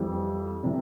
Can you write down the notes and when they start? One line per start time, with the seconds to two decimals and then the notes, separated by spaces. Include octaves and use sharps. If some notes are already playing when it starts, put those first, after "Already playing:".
Already playing: F2 E3 G3 C4
0.63 C3 E3 G3